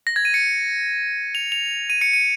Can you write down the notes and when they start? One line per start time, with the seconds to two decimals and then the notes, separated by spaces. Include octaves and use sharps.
0.07 A#6
0.16 G#6
0.25 D#7
0.34 C#7
1.35 F7
1.52 F7
1.90 D#7
2.01 C#7
2.13 D#7